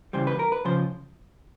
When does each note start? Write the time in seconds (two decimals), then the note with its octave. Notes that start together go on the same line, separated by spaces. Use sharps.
0.13 C#3 E3 G3 C5
0.27 B4
0.39 A#4
0.52 B4
0.65 C#3 F3 C5